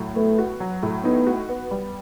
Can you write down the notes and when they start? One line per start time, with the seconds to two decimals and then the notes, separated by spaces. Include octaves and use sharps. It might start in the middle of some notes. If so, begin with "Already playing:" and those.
Already playing: A2 F#3
0.15 A3 B3
0.38 F#4
0.60 F#3
0.83 A2
1.04 B3 D#4
1.27 F#4
1.49 B3
1.71 G3